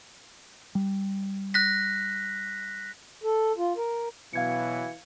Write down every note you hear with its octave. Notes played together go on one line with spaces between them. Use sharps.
G3
F#6 A#6 B6
A4
F4
A#4
B2 E3 F#3 F5 G#6 C#7